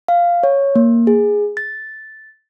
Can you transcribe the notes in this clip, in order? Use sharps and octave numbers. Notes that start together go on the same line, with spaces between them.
F5
C#5
A#3
G#4
A6